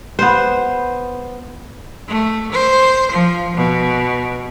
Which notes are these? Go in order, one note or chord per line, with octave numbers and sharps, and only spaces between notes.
B3 C5
A3
C5
F3
B2